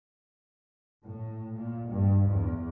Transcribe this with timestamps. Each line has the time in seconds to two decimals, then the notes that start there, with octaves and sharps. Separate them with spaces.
1.05 A2
1.56 A#2
1.89 G2
2.29 E2